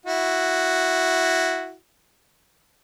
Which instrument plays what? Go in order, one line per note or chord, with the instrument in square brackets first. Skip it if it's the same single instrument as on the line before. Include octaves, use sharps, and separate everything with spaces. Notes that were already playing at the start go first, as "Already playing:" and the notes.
[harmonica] E4 F#4